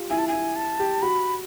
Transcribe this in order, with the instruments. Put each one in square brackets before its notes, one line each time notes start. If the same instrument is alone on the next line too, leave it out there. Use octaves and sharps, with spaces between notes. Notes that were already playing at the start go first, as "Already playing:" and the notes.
Already playing: [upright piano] F4 G4
[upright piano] E4 [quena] G#5
[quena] A5
G#5
[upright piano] E4
[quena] A5
[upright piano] G4
[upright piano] F#4 [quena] B5